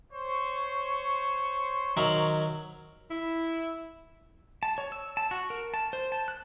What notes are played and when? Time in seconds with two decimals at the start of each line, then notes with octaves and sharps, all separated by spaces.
0.12 C5 C#5 C#6
1.97 D#3 F#3 E5
3.11 E4
4.63 A5
4.78 C#5
4.92 E6
5.17 A5
5.31 F#4
5.50 A#4
5.74 A5
5.93 C5
6.12 A5
6.28 F#6